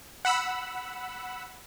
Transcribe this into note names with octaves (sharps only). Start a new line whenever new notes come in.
F#5 B5 E6